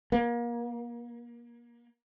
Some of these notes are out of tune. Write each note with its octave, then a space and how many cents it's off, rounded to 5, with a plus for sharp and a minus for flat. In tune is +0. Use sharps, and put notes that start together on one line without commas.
A#3 +30